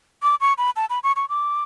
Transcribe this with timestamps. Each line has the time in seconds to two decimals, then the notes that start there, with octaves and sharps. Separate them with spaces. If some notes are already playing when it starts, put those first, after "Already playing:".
0.23 D6
0.41 C#6
0.58 B5
0.76 A5
0.90 B5
1.04 C#6
1.16 C#6
1.29 D6